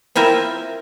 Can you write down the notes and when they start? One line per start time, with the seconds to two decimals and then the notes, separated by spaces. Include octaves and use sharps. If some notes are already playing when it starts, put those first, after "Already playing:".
0.16 C4 E4 F4 A#4 E5